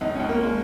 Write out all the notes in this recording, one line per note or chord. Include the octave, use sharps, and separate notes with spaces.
C#2 D#4
C#2 C#4
A#3
F3 G#3